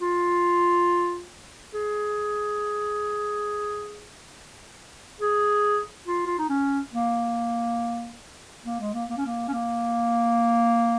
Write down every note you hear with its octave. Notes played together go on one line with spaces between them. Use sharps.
F4
G#4
G#4
F4
F4
D#4
C#4
A#3
A#3
G#3
A#3
A#3
C#4
A#3
C#4
A#3